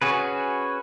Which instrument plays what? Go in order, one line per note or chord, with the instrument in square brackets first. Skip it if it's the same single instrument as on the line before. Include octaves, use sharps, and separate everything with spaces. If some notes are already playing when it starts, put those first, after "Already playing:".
[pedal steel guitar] C#4 F#4 G#4 B4